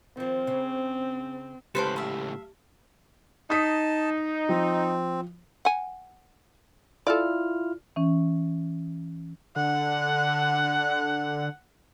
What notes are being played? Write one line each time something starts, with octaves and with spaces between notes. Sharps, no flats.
D#3 F3 C4
C#3
C#2 A2 G4 B4 C5 F5 A5
E5 F5
D#4 A5 D#6 B6
F3 C4
F#5 G#5
E4 F4 A4 D5 F6
E3 C#4
D3 F#5